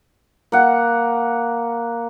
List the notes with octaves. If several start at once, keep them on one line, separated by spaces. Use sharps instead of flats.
A#3 F#5